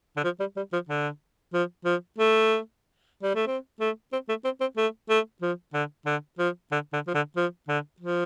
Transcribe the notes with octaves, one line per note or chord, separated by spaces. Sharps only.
D3
F3
G3
G3
F3
D3
F3
F3
A3
G3
A3
C4
A3
C4
A3
C4
C4
A3
A3
F3
D3
D3
F3
D3
D3
F3
D3
F3
D3
F3